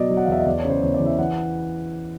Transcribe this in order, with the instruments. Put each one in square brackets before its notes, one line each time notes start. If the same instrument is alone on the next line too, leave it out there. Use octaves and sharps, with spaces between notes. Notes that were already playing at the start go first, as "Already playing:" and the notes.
Already playing: [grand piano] B2 F#3 D5 D#5
F#3
F#5
F5
E2 E5
D#5
E2 D5
C#5
C#3
C5
E2 C#5
D5
E3
E5
E3 F#5